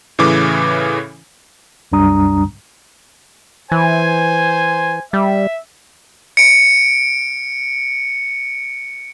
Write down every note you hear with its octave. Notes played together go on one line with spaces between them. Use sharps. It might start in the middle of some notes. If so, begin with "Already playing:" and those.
A2 C#3 E3 D6
C2 F#2 G3 D4 A#5 D#6
E3 C5 G#5
G3 E5
C#7 D7